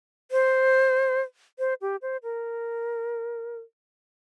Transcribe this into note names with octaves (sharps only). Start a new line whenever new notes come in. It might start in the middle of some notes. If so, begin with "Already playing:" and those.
C5
C5
G4
C5
A#4